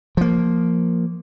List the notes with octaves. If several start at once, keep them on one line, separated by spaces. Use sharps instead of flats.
F3 A#3